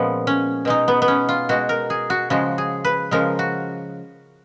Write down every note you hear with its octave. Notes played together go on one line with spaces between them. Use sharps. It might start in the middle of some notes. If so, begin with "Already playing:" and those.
Already playing: A#2 F3 G#3 B3 C#4
C#4
B2 G#3 D#4
B3
B3
C#4
F4
B2 G#3 F#4
A#4
G#4
F#4
C#3 F3 G#3 F#4
G#4
B4
C#3 F3 G#3 A#4
F#4